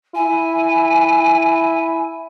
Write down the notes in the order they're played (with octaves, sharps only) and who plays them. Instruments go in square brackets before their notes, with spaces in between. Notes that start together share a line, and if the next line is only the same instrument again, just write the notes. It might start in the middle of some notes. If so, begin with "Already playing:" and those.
[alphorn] E4 [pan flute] G#5